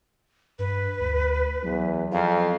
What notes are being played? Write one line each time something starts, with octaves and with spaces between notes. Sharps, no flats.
G2 B4
D2
E2 F#3
F2 F5